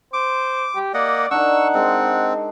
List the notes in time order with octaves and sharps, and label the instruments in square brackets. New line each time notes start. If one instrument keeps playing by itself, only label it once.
[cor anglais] C5 [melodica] D6
[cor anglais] G4
[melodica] A#3 D#5 F#5 [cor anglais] D5
[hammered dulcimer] D4 D#4 A#4 [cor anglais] F#5 [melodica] C#6 E6
[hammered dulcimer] G#3 A#4 [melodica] C4